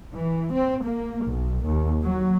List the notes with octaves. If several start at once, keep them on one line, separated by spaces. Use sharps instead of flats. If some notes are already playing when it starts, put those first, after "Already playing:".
E3
C4
A#3
B1
D#2
F#3